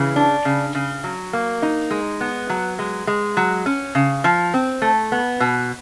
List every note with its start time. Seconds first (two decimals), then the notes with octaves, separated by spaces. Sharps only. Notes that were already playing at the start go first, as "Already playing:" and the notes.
Already playing: C#3 E3
0.16 D4
0.45 C#3
0.75 C#3
1.04 F#3
1.33 A#3
1.62 D#4
1.91 G#3
2.21 B3
2.50 F#3
2.79 G#3
3.07 G#3
3.37 F#3
3.66 C#4
3.95 C#3
4.24 F3
4.54 C4
4.82 A3
5.12 B3
5.40 B2